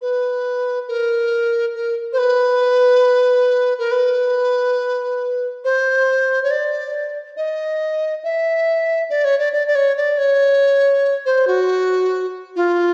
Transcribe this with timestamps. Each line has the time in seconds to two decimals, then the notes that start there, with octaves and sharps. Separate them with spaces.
0.01 B4
0.88 A#4
1.75 A#4
2.12 C5
2.18 B4
3.78 A#4
3.91 B4
5.64 C5
6.43 C#5
6.50 D5
7.36 D#5
8.23 E5
9.10 D5
9.24 C#5
9.39 D5
9.53 D5
9.67 D5
9.75 C#5
9.96 D5
10.17 C#5
11.25 C5
11.47 F#4
12.56 F4